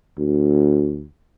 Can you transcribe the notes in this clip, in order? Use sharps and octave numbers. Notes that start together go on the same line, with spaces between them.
D2